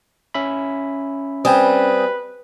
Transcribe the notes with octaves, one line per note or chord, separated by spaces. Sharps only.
C#4 E5 B5
G3 C4 B4 G5 G#5 D#6